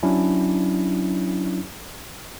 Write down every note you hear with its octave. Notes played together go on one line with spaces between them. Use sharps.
F#3 C#4 D4 E4